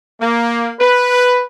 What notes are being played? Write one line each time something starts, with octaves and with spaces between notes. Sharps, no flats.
A#3
B4